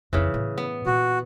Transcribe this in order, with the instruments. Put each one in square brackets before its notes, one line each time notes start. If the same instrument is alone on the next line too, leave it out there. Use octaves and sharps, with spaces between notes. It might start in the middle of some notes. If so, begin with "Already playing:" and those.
[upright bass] F2 E4 [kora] C#3 E3
[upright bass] A2
[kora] B3
[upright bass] A#2 [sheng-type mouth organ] F#4